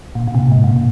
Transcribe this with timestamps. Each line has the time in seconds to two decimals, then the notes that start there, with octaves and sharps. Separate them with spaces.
0.15 A#2
0.28 A#2
0.35 C3
0.40 A#2
0.52 G#2
0.64 A#2
0.76 A#2